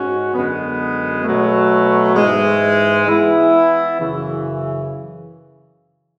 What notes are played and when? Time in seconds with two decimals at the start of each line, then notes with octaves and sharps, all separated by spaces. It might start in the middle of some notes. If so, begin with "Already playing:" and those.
Already playing: G#2 G#3 C#4 F#4
0.33 F#2 D3 G#3 B3
1.25 B2 F#3 A3
2.16 G#2 E3 G#3
3.07 E3 B3 E4
3.99 F#2 C#3 E3